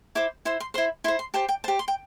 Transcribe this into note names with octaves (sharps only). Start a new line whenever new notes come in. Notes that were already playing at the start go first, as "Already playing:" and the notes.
E4 C5 D6
E4 C5 C6
C6
E4 C5 C6
E4 C5 C6
C6
G4 C5 A5
G5
G4 C5 A5
C6
G5